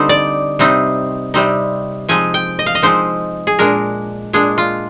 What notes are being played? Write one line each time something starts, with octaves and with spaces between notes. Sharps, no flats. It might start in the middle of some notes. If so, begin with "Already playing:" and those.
Already playing: D3 G3 C4 D#4 C5
D5
C3 G3 C4 D#4
C3 G3 C4 D#4
F3 G#3 C4 D#4 G#5
G5
D#5
F5
D#5
F3 G#3 C4 D#4 C5
G#4
A#2 G#3 D4 A#4
A#2 G#3 D4 G#4
F4